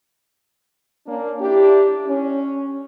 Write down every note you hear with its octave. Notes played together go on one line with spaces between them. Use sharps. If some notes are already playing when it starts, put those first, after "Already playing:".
A#3 C#4 D4
D4 E4 G4
C#4